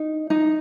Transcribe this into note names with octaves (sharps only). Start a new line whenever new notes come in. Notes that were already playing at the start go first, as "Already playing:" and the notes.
Already playing: D#4
D#4